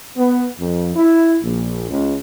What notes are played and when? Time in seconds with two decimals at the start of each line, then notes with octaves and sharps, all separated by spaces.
0.17 B3
0.58 F2
0.95 E4
1.42 A#1
1.89 C#2